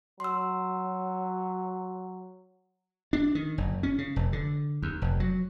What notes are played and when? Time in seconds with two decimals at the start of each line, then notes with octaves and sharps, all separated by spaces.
0.20 F#3 C6 E6
3.13 D4
3.35 D#3
3.58 F#1
3.83 C#4
3.98 C#3
4.16 F1
4.33 D3
4.82 D#2
5.02 F1
5.20 F#3